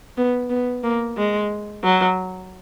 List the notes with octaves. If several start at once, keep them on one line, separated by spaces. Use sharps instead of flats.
B3
B3
A#3
G#3
F#3